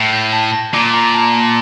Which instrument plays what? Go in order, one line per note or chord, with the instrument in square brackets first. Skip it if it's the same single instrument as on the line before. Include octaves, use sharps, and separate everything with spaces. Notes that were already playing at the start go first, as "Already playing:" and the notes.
Already playing: [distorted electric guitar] A2
[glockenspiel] G6
A5
A#6
[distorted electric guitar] A#2 [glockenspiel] D6
[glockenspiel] A#5
A5
A5